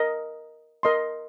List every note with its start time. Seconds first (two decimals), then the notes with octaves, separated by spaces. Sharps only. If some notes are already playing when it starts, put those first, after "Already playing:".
Already playing: A#4 D#5 A#5
0.83 A#4 D#5 C6